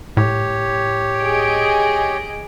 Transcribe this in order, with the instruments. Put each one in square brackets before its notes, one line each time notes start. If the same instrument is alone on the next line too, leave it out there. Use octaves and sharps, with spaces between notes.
[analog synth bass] A2 [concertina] G4 C#5
[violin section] G#4 D#5 D7